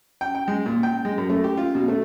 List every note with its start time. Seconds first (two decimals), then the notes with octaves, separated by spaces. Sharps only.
0.21 G5
0.35 G5
0.48 G#3
0.66 A#2
0.83 G5
1.05 G#3
1.18 F#2
1.30 A3
1.44 G4
1.57 F4
1.75 B2
1.88 A3